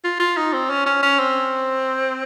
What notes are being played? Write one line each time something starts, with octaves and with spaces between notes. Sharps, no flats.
F4
F4
D#4
C4
C#4
C#4
C#4
C4